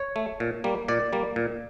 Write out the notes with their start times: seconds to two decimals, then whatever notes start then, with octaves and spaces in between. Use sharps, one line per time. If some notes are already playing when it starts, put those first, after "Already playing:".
Already playing: C#5
0.16 A3
0.40 A#2
0.64 G3 A#3
0.88 A#2 D5
1.13 G3 A#3
1.36 A#2